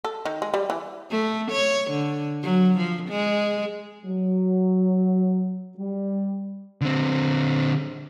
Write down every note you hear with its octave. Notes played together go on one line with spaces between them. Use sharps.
A4
D#3
G#3
G3
E3
A3
C#5
D3
F#3
F3
G#3
F#3
G3
D3 C4